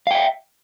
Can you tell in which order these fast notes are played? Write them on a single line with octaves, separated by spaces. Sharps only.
F5 G5 E5